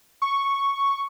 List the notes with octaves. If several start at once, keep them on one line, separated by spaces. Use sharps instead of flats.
C#6